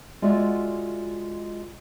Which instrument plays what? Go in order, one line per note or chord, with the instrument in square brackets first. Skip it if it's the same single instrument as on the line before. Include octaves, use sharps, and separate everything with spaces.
[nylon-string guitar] G#3 F4 F#4 D5 E5